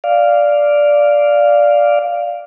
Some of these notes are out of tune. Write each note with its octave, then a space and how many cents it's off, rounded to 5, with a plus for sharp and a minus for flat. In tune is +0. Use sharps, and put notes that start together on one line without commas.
D5 -5 F5 +0